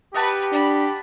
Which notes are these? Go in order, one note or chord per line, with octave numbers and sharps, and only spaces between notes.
G4 B4 D#5 F#5 A5 B5
D4 B5